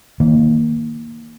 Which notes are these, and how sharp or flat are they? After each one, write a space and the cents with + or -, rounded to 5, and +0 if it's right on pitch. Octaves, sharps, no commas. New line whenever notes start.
D#3 +20 A#3 -5